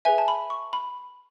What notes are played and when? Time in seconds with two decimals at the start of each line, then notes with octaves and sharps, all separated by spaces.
0.05 G#4 B4 E5 G#5
0.18 A5
0.28 B5
0.50 C#6
0.73 B5